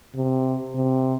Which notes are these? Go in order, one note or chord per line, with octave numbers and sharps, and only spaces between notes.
C3
C3